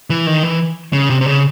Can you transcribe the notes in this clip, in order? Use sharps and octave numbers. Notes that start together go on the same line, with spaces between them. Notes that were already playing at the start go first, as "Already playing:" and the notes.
E3
D#3
E3
C#3
C3
C3
C#3